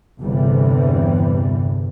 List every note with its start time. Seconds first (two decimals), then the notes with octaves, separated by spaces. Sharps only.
0.19 G1 E2 G2 C3 E3 G3